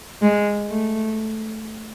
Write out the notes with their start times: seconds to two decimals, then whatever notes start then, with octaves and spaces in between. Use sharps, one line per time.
0.22 G#3
0.70 A3